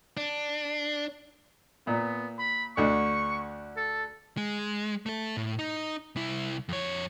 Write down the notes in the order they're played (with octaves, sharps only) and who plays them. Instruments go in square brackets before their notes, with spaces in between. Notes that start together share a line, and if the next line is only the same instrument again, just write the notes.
[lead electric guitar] D4
[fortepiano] A#2 [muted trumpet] B3
[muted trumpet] B5
[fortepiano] D2 D3 [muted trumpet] C#6
[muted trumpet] A4
[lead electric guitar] G#3
A3 A4
A2
D#4
C2 E4
F2 C#5